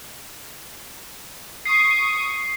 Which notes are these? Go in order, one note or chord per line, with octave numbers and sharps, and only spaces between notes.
C#6 D#6 C7